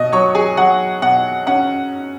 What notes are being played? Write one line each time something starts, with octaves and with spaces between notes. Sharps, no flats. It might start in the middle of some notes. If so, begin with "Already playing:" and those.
Already playing: B2 D#5 D#6
F#3 C#5 C#6
G#4 G#5
F#3 F#5
B2 F#5
C#4 F#5